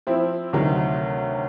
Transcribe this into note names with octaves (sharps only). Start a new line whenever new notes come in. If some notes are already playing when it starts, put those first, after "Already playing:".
F3 C4 E4
D2 C3 D#3 F#3